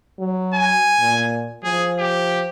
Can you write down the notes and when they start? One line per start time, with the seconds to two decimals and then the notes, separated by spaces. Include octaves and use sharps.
0.19 F#3
0.54 G#5
1.00 A#2
1.64 F3 G#4
1.99 G4